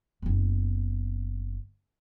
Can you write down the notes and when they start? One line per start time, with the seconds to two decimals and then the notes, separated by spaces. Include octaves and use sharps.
0.22 F#1 B3